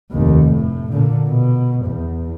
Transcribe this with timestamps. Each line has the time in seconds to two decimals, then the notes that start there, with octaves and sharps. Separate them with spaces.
0.12 F1 D#2
0.47 A2
0.92 A#2 D3
1.29 B2
1.86 E2